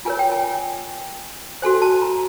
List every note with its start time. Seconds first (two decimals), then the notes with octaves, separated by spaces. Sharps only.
0.05 F4 A#4 C#5 G#5
0.19 G5
0.32 G#5
1.62 F#4 A4 C5 G#5
1.82 A5
2.02 A#5